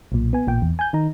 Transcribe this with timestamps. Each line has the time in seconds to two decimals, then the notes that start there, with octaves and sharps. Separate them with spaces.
0.12 B1 A#2
0.33 B3 G#5
0.47 A1 A#2 G5
0.62 E2
0.79 G#5 G6
0.93 D#3 D#4 A#5